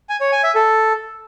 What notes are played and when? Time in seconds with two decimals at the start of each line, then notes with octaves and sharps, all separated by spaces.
0.09 G#5
0.21 C#5
0.32 G#5
0.44 E5
0.55 A4